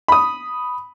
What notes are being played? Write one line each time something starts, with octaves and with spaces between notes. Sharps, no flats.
B5 D#6